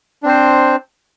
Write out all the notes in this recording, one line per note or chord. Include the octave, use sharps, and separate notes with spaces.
C4 D4 C5